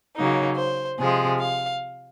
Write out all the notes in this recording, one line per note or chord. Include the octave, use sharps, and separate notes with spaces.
C#3 F#3 A#3 D#4
C5
C3 F3 G#3 G#4
F5